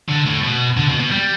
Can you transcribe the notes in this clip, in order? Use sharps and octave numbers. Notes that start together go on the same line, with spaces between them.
D3
A2
B2
D3
B2
B2
G3